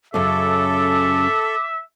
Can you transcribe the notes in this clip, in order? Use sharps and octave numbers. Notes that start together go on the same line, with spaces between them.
F#2 C#3 A4 E5 D6